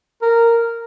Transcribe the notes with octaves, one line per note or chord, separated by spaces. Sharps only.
A#4